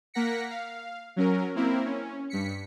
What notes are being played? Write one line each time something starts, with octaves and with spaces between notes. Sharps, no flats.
A#3 A#4 F#5 A#6 B6 C#7
F5
F#3 C#4 A#4
A#3 C4 E4 A#4
C#4
G2 B6 C#7